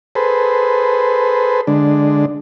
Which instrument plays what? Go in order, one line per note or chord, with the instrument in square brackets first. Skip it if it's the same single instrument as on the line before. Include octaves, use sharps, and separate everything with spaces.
[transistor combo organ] G#4 A4 B4 C5
D3 G#3 D4